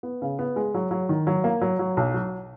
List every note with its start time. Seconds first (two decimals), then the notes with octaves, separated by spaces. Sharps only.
0.03 B3
0.22 C#3
0.39 B3
0.56 G#3
0.74 F#3
0.91 F#3
1.09 D#3
1.27 F#3
1.44 A#3
1.62 F#3
1.79 F#3
1.97 B1
2.14 F#3